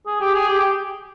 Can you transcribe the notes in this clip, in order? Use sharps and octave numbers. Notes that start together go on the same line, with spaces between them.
G#4
G4
G#4
G4
G4